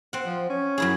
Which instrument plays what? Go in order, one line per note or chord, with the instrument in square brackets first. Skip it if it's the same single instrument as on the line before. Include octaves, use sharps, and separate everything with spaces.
[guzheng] C4 F#5
[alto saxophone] F3
C#4
[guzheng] F#2 E4 G#4